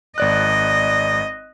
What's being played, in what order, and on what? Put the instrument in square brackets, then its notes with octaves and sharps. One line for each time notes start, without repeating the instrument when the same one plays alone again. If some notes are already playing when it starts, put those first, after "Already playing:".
[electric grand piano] G#1 D5 F#6 [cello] D#5